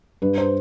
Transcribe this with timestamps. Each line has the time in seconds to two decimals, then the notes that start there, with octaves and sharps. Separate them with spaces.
0.22 G2 B4
0.38 C5